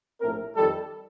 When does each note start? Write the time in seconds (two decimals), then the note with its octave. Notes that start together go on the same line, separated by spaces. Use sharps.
0.21 A#1 A2 A3 C4 A#4
0.56 F2 D#3 G3 A4